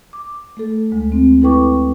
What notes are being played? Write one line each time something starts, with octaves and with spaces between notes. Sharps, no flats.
D6
A3 A4
D2 G#3
C4
E4 A4 B4 G5 C#6 D6